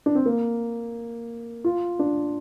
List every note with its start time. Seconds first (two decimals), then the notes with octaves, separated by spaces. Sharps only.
0.06 D4
0.15 C4
0.26 A#3
1.64 F4
1.99 D4